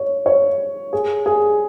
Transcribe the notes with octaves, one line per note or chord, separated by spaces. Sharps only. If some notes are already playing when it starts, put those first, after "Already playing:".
Already playing: C#5
C#5
G#4
G#4